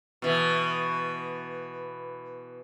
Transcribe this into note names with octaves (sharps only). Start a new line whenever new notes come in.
B2 E3